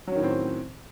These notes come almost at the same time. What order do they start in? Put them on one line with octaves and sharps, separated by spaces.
F#3 C#4 D#3 A2 C4